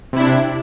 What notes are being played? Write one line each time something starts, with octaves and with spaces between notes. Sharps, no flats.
C3 D4 E4